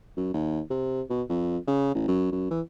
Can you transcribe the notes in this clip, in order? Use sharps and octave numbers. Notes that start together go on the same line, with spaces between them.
F#2
D#2
C3
B2
F2
C#3
A1
F#2
F#2
E3